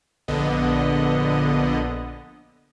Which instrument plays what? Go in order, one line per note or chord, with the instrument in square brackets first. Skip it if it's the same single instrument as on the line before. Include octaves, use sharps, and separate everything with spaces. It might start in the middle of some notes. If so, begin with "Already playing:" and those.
[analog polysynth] A#1 D3 B3 D#5